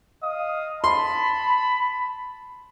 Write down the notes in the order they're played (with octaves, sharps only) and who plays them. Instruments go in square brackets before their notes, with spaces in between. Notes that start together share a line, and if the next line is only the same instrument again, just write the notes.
[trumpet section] D#5 F5 D#6
[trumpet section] A5 B5 [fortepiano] C6